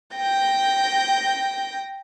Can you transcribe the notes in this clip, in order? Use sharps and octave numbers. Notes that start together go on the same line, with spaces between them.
G5 G6 A#6